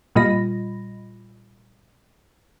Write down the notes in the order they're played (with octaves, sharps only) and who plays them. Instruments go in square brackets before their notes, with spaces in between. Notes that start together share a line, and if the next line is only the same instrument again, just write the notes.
[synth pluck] A#2 G3 F4 D#5 B5 A#6